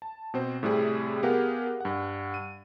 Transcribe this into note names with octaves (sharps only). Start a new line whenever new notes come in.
A5
B2 C4 C5
A2 C3 G3 C4 G#4
B3 G4 G#4 A#4 F5 F#5
G2 F#5
D#7